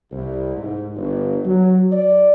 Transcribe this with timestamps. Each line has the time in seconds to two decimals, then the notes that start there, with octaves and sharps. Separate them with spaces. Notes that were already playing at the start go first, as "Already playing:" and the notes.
0.11 C2
0.57 G#2
0.96 G1
1.45 F#3
1.92 D5